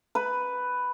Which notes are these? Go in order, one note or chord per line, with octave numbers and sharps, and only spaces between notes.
B4 B5